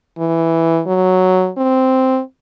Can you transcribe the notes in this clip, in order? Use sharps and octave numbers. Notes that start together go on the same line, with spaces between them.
E3
F#3
C4